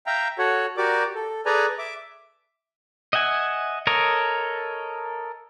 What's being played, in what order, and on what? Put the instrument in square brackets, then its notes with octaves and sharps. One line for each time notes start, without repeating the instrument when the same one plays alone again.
[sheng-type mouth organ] E5 F5 G5 A#5
F#4 A4 C#5 F#5
F#4 G4 A#4 D5 D6
A4
G#4 A4 B4 D5 G#5 A#5
E5 D6
[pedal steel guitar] D#5 E5 F#5 G#5
A4 A#4 C#5 D#5